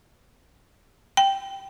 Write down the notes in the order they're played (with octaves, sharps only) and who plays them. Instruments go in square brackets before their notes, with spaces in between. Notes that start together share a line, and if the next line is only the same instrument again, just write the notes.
[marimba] G5